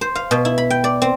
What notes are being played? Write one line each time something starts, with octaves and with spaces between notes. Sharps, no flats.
C5
F5
B2
E4
B5
G5
D5
C4